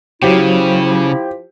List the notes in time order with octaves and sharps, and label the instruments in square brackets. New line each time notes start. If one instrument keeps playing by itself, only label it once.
[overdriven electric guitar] C#3 [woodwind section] F3 E4 [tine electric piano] F#3 [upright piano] G4